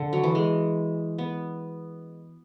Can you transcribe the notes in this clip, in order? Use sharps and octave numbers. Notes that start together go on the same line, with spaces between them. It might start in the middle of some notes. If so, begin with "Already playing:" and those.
Already playing: D3
F#3
E3
G#3
B3